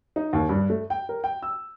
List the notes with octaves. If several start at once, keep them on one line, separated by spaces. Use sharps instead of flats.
D#4
D#2
G2
A3
G5
A#4
G5
E6